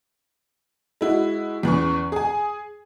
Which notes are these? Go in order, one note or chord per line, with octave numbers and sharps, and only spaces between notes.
G#3 E4 F#4
E2 E3 C#4 C#6
G#4 G#5